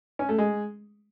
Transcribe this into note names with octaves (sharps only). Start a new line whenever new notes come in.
C#4
A3
G#3